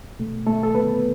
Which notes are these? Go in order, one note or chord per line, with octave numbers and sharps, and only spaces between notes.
B2 A3
A3 A4
A4
B3 B4